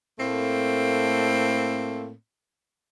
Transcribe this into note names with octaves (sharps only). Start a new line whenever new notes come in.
A2 A3 A#3 C4